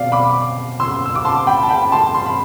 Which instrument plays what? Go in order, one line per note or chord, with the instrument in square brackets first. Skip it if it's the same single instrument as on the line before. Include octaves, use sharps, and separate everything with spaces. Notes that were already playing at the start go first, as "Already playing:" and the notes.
Already playing: [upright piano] B2 C4 D5 F5
B5 D6
C6 E6
E6
D6
A5 C6
G5 B5
A5
G5 B5
A5 C6
C6
B5